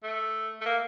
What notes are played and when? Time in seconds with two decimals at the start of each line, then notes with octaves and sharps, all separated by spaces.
0.03 A3
0.61 A3
0.65 A#3